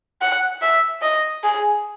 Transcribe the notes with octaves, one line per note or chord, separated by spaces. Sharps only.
F#5
E5
D#5
G#4